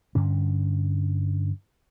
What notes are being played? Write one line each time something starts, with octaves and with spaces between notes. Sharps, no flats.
G2 D3 C#4